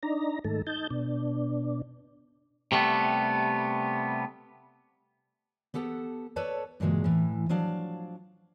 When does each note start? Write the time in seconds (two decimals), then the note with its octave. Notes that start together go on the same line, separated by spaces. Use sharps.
0.03 D4 D#4 A#5
0.44 G#2 D#3 A3 A4
0.67 D#4 A5 G6
0.90 B2 D4
2.72 C3 G3 A3 B3
5.74 B3 G4 A4 F#5 A5
6.36 A4 B4 C#5 D5 A5
6.80 G2 A#2 C#3 E3 F#3 G#3
7.04 A2 E3
7.49 F3 F#3 D4 F5 A5